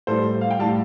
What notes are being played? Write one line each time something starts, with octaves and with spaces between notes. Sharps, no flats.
A2 G3 A4 C5
F5
G5
A2 G3 F5 A5